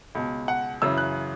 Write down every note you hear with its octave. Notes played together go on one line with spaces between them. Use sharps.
C#2 B2
F#5
F#2 C#3 E3 E6
F#6